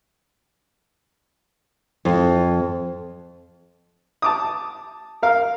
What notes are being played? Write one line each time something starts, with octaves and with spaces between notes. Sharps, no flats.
F2
A5 D6 D#6
A#4 F5